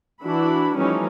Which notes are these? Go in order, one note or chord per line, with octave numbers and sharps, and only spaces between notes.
E3 D4 E4 F#4 B5
E3 F3 G3 A3 C#4 D#4